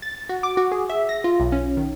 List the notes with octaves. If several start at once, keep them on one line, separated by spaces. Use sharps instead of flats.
A6
F#4
D6
F#4
G#4
E5
A#6
F4
B1
C#4
D#3